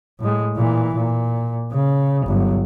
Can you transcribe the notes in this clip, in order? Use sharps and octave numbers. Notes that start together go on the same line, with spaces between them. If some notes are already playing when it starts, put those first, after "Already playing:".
A2 G#3
A#2 E3
A#2
C#3
G1 F#3